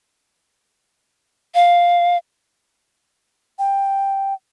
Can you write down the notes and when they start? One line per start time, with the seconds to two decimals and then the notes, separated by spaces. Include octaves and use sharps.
1.55 F5
3.59 G5